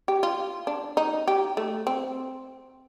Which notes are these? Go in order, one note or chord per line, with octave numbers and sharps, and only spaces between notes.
G4
F4
D4
D#4
G4
A3
C4